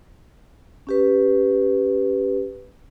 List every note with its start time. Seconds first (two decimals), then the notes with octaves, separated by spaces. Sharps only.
0.87 C#4 G4 B4